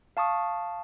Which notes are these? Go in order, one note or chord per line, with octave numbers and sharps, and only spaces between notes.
F5 A5 C#6 D#6